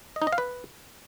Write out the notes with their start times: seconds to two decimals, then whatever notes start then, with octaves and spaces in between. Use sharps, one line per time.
0.16 D#5
0.22 D#4
0.27 D#5
0.33 F5
0.38 B4